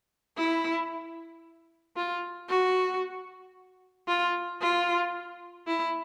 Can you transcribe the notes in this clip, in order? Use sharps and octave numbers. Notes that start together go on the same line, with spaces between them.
E4
F4
F#4
F4
F4
E4